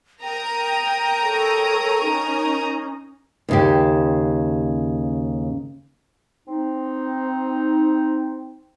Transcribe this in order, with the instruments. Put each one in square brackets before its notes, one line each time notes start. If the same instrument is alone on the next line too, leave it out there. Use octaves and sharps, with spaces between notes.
[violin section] A#4 A#5 D#6 [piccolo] G5
[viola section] A4 C#5
C#4 D#4
[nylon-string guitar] D#2 C#3 G4
[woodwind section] C4 D#4